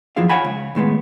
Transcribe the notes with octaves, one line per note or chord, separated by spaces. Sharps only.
F#2 F3 E4 F4 G#4 F5
C#5 D5 F5 F#5 G#5 B5
C#2
D#2 A2 G#3 B3